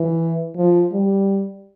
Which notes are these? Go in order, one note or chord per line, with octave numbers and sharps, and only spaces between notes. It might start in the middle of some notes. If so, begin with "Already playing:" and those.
Already playing: E3
F3
G3